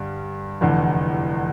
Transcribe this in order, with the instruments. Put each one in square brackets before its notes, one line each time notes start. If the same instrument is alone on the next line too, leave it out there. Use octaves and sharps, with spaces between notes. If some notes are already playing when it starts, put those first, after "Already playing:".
Already playing: [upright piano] G2 D3 G3
F1 E2 D3